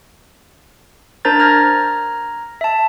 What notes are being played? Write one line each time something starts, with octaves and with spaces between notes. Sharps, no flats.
D4 A#4 C5 A#5 G6 A6
A#5 F6 G#6 A#6
E5 A5